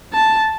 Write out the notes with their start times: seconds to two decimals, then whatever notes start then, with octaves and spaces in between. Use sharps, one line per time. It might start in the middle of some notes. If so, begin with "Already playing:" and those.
0.14 A5